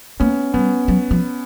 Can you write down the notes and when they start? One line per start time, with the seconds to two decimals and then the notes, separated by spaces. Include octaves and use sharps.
0.20 A#3 B3 C#4
0.53 G3 B3 C#4
0.88 F#3
1.11 F3